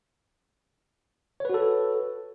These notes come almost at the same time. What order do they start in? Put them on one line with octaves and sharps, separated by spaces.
C#5 B4 F#4 A4